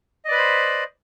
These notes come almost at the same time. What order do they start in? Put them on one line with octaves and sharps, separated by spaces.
D#5 D5 B4 B5 C5